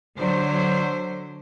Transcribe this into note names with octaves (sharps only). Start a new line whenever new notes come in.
D3 F#3 C5